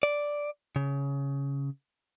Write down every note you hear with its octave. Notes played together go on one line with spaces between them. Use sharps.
D5
C#3